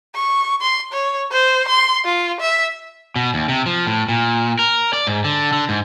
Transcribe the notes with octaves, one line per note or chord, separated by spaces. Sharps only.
C#6
C6
C#5
C5
C6
F4
E5
B2
D#2
C3
F3
A2
A#2
A#4
D5
G#2
D3
D3
G#2